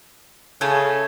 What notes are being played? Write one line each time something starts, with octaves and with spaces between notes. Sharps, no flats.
C#3 A3 A4 G#5